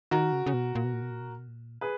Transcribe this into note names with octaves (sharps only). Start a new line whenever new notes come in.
D#3 F#4 A#4
C#3
C#3
B2
A#2
B2
A#2
B2
A#2
B2
A#2
B2
A#2
G#4 B4